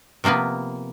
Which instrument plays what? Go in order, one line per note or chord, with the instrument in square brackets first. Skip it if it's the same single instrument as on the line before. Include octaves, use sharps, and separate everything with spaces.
[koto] C3 F3 A#3 B3 B4